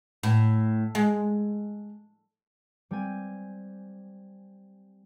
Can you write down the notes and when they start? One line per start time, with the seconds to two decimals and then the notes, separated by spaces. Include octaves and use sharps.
0.23 A2
0.95 G#3
2.91 G3 C4 G#5